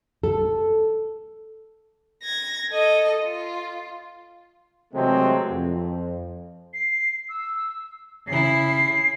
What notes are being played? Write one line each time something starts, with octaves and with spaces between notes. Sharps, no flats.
A4
G#6 A#6
A4 D#5
F4
C3 E3 F#3 G#3 A3 C4
F2
C7
E6
C#3 E4 C7